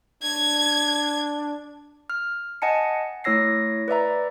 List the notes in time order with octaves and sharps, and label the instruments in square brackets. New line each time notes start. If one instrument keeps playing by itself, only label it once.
[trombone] D4 [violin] G#6
[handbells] F6
D#5 F#5 G#5 A5 C#7
A3 E4 C#5 E6 A#6 C7
B4 D5 E5 A#5